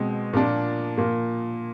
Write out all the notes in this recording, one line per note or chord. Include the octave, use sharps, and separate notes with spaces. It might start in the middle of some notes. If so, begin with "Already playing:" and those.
Already playing: B2 G#3 C4
A#2 F3 A#3 D4
A#2 F3 A#3